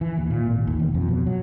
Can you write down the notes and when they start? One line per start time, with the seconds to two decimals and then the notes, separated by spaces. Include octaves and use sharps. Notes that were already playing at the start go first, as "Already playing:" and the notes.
0.01 E3
0.18 D#2
0.30 A#2
0.45 G#1
0.67 D#2
0.79 E1
0.94 F2
1.08 B2
1.26 F#3